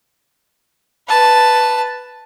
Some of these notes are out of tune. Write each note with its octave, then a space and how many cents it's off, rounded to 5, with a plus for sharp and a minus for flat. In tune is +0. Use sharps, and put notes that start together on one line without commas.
B4 +0 A5 +0